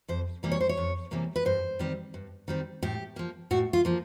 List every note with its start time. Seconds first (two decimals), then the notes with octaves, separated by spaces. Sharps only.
0.08 F2 C5
0.43 C3 E3 G3 A#3
0.52 C#5
0.61 C5
0.69 C#5
0.77 F2
1.11 C3 E3 G3 A#3
1.36 B4
1.45 G2 C5
1.79 D#3 G3 C4
2.14 G2
2.48 D#3 G3 C4
2.82 A2 G4
3.16 F3 A#3
3.51 A2 F#4
3.73 F4
3.85 F3 A#3